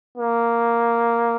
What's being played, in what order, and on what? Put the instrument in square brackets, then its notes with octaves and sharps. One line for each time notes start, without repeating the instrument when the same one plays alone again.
[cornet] A#3